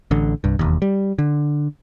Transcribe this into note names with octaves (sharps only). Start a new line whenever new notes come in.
A1 D3
C2 G2
E1 D#2
G3
D3